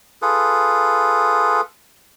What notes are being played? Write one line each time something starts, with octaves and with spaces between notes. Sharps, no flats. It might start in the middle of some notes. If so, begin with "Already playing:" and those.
F4 G#4 A4 B4